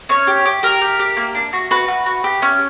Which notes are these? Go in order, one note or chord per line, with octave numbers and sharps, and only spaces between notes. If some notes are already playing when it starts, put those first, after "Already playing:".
C#4 C#5
G4
G4
G4 A#4
G4
G4
A#3
D4
F#4
F#4 B4
F#4
F#4
G4
C#4